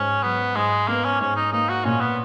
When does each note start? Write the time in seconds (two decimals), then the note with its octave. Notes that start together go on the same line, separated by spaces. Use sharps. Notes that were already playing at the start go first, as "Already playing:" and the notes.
Already playing: G#2 C#4
0.23 F#3 B3
0.55 G#2 G#3
0.88 A#3 B3
1.04 C#4
1.20 G#2 C#4
1.36 D#4
1.52 A#3 D#4
1.69 F#4
1.84 A#2 C#4
2.01 B3